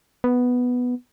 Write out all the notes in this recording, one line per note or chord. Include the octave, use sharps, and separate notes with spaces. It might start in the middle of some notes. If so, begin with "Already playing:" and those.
B3